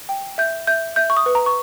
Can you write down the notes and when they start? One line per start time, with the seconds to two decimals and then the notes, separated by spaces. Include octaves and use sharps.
0.09 G5
0.38 E5 G6
0.67 E5 G6
0.96 E5 G6
1.10 C#6
1.17 D#6
1.26 B4
1.35 A#5
1.46 C#6